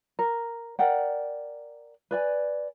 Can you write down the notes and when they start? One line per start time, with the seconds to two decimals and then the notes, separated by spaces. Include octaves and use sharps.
0.19 A#4
0.79 A#4 D5 F#5 G5
2.11 B4 D5 G#5